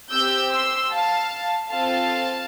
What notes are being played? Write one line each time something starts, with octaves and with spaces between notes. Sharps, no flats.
C4 G4 E6 G6
C6 E6
F5 A5
C4 F4 A4 F5 A5